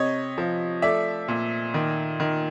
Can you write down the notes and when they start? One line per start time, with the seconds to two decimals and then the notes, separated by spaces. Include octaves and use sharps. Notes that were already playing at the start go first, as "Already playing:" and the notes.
Already playing: C3 C#5 D#5
0.38 F3
0.82 A3 D5 E5
1.28 A#2
1.74 D#3
2.20 D#3